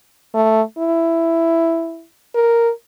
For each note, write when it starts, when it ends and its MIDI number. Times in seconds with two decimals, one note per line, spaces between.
0.34 0.62 57
0.78 2.05 64
2.34 2.71 70